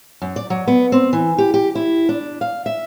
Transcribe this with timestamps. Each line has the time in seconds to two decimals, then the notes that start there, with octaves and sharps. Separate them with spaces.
0.22 F#2
0.36 D5
0.50 F#3
0.68 B3
0.92 C4
1.13 E3
1.38 G4
1.54 G4
1.75 E4
2.09 D4
2.41 F5
2.66 E5